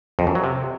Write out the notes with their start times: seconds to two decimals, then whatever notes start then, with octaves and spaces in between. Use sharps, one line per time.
0.19 F2
0.27 F#2
0.35 F#3
0.44 C3